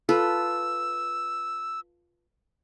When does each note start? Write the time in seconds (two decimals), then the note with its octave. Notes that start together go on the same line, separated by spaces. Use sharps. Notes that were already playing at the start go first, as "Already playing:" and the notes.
0.09 F4 A4 B4 E6